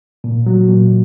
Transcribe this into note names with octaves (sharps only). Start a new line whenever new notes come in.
A#2
F#3
A#2